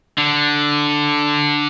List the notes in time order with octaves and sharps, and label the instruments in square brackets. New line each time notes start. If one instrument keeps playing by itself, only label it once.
[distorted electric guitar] D3